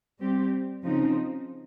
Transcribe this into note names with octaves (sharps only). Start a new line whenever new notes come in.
G3 C4 G4
C#3 F3 C4 D#4